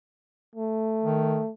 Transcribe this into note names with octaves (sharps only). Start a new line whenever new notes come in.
A3
D#3